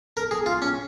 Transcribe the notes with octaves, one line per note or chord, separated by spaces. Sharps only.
A#4
G#4
F4
C#4